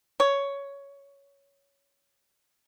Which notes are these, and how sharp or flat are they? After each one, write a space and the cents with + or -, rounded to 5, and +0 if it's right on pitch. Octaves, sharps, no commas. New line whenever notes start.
C#5 +10